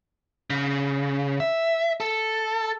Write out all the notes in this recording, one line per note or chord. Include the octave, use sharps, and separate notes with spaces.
C#3
E5
A4